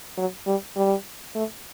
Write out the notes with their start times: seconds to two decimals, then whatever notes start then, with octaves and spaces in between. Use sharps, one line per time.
0.17 F#3
0.47 G3
0.77 G3
1.35 A3